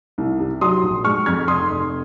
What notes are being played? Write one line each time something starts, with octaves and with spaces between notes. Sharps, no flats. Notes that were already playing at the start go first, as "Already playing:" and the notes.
C2
C3
F#3 C6 D#6
A#1
G#3 C#6 F6
F2 F6 G#6
F1 C6 D#6
F1